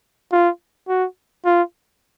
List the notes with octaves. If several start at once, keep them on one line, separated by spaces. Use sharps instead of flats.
F4
F#4
F4